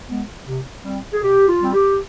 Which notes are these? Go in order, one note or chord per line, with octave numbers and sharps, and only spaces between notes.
G#3 B3
C3
G3 C4
G#4
B2 G4
F4
G3 C4
G4